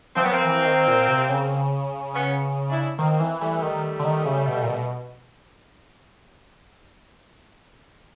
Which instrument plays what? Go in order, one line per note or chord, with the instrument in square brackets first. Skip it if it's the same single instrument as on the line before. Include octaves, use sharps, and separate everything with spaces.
[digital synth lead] F3 [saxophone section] C4
[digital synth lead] F#3 [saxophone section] B3
[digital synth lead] F3 [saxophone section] A#3 C4
[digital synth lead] E3
D#3
A#2
C3
C#3
[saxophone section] B3 C#4
D4 E4
[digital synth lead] D#3 [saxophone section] A#3 C4
[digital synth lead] E3
[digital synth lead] E3 [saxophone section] G3 A3
[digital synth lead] D#3
D3
D#3
C#3
B2
A#2
B2